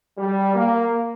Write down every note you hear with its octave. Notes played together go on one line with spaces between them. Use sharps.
G3
A#3